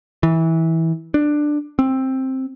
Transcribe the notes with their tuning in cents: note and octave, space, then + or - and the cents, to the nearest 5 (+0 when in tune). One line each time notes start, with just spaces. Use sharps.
E3 -20
D4 +10
C4 +10